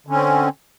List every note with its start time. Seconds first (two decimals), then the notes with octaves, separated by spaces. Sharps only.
0.07 D3
0.10 C#4
0.14 C4